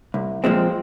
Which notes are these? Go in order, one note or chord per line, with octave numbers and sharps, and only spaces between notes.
C2
A#2 F3 G#3 C4